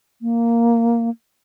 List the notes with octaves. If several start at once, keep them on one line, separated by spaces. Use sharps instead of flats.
A#3